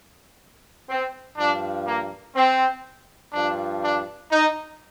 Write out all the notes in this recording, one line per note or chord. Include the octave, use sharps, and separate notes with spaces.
C4
G2 F3 D4
A#3
C4
G2 F3 D4
D4
D#4